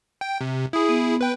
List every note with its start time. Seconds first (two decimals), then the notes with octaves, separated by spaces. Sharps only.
0.21 G5
0.41 C3
0.73 E4 G#4 D#6
0.89 B3
1.21 B4 G5